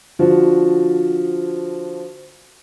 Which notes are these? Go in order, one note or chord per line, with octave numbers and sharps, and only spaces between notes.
D3 F3 F#4